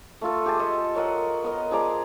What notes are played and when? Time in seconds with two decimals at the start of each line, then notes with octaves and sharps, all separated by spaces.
0.21 A3 F4 A4
0.46 G4 G#4 A5
0.59 G4 A4 D#5
0.95 F#3 A#4 D#5 F#5
1.44 B3 A#4 D#5
1.71 F3 G#4 D5 A#5